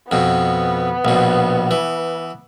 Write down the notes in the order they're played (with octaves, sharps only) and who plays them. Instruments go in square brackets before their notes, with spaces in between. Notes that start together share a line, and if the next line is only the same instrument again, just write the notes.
[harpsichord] F2 B2 [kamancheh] B3
[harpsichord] A#1 B2
E3